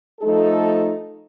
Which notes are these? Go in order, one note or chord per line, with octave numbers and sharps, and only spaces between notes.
F3 A3 D#4 A4